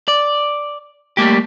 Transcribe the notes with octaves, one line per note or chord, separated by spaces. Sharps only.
D5
G3 A3 A#3 G4